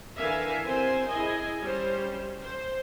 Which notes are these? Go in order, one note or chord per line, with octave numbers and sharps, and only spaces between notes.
D3 E3 A#4 E5 F5 G#5
C4 G4 A#4 C5 G#5
E4 G#4 D#5 G#5
G3 C#4 C5
C5